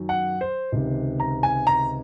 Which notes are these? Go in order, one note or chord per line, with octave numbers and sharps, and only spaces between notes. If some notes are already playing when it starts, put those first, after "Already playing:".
Already playing: F#2 D#3 F#3
F#5
C5
C#2 C3 D#3
A#5
G#5
A#5